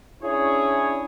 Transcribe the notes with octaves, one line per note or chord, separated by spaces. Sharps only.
C#4 D4 E4 G#4 C#5